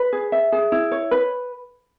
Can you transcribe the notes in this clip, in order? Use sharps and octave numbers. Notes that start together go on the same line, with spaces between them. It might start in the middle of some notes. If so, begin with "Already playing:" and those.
Already playing: B4
G#4
E5
G#4
E4
C#5
B4